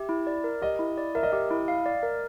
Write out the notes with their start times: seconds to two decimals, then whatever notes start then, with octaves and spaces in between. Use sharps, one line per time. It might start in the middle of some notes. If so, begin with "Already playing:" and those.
Already playing: G4 E5
0.09 E4
0.27 D5
0.44 A#4
0.62 G4 D#5
0.79 E4
0.98 D5
1.15 A#4 E5
1.23 D#5
1.32 G4 E5
1.51 E4
1.68 F5
1.86 D5
2.03 A#4